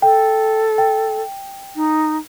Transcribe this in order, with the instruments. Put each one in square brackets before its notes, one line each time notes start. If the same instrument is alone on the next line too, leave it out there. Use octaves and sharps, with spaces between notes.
[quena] A4 [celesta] G5
[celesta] G5
[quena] D#4